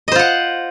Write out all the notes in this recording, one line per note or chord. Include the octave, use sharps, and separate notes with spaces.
F4 C5 D#5 F#5